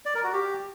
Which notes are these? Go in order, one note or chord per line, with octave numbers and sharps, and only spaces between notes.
D5
A#4
F#4
G4